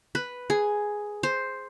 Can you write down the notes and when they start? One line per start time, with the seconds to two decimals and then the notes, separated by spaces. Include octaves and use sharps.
0.15 B4
0.50 G#4
1.23 C5